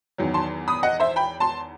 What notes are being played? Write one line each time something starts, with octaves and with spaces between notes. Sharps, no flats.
E2 D#3 F#3
A5 C6
B5 D#6
D#5 F#5
C5 E5
G5 B5
A5 C6